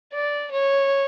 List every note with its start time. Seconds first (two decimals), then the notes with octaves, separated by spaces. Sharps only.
0.13 D5
0.52 C#5